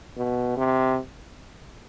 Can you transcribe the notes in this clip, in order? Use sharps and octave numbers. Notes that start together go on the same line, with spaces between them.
B2
C3